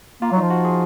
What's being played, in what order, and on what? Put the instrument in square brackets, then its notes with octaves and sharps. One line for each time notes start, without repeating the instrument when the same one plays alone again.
[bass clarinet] A#3 [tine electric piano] F4
[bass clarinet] F#3
[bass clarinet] F3 [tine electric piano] D#4
[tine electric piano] F#4
G#4